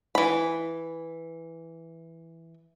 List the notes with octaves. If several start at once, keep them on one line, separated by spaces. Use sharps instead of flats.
E3 B5